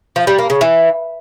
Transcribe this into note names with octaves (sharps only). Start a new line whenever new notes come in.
F3
G3
A#3
C#3
E3